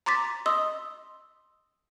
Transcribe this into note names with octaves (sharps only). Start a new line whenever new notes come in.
A#5 C6 D6 A6 B6
D#5 C6 D#6 E6